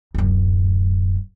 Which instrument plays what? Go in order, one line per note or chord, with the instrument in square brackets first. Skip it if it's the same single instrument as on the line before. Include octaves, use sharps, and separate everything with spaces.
[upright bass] D1 F#2